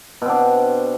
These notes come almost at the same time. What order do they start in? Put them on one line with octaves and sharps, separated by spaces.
B2 C4 D4